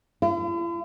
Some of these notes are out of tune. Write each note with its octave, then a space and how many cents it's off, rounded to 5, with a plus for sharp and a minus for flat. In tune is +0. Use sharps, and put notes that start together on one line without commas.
E4 +45